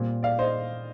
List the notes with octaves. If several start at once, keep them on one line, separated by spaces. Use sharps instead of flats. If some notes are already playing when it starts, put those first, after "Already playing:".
Already playing: A#2 G3 C4
D5 F5
C5 D#5